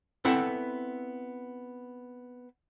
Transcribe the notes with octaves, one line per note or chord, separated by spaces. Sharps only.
B3 C4 E4 A4 F#5